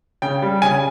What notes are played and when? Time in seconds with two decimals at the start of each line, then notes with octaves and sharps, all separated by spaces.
0.22 C#3 G5
0.42 G3
0.62 C#3 G#5